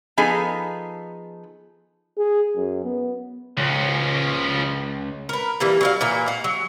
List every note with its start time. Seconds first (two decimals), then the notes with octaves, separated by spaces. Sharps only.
0.17 F3 B3 D#4 G#4 A4
2.17 G#4
2.56 F#2
2.84 B3
3.57 C#2 F3 C#4
5.29 A#4 B4
5.60 E3 G3 A#3
5.81 F#3 D4 F5
6.01 A#2 E3 A#3
6.28 F5 F#5
6.44 F#3